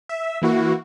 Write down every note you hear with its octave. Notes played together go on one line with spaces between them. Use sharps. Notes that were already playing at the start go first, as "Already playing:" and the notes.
E5
E3 A#3 E4 F#4